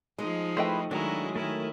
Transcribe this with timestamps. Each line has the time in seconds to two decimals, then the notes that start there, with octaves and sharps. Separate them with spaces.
0.18 F3 G#3 D#4
0.57 A3 E4 B4 C5 D#5 G5
0.91 D#3 F#3 G#3 D4 E4 F#4 A#5
1.35 D#3 A3 E4 A#4 G#5